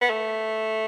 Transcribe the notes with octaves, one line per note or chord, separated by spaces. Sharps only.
B3
A3